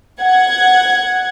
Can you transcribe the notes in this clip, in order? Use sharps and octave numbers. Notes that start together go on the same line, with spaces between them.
F#5 G#6